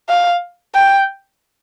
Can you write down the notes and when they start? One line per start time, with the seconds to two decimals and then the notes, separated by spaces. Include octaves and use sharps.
0.09 F5
0.75 G5